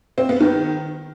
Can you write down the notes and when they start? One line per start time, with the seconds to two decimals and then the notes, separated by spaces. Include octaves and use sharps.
0.18 C4
0.29 B3
0.41 D#3